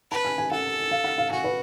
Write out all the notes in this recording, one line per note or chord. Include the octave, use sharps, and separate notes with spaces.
B4 A5
G#5
G#5
A4 F#5
F5
F#5
F5
F#4 G#5
B4